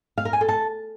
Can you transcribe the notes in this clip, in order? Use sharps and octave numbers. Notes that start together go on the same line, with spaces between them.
F5
A#4
G#5
A4
A5